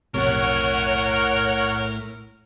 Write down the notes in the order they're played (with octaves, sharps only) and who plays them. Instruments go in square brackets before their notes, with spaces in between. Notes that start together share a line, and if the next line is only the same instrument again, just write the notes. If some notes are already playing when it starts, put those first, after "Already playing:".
[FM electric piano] B1 F2 C3 [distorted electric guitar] A2 [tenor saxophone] A#4 [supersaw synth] C#5 F#5